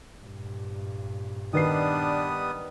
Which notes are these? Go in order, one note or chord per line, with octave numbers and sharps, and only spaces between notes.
G2 A#2
D#3 G3 B3 D4 B4 D#6 C7